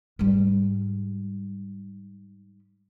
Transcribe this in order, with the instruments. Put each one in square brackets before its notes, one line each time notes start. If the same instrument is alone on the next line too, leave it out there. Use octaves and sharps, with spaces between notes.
[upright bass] G#2 G3